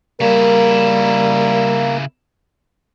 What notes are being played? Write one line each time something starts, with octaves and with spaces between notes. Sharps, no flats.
C#3 G3 A#3 E4 A#4